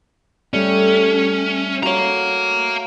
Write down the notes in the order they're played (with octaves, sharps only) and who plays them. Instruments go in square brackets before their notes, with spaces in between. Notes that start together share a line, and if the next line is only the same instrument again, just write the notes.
[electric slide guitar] G3 G4 D5 [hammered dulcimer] A3 [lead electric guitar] C#4
[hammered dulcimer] F#4 C#5 [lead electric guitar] F5 A#5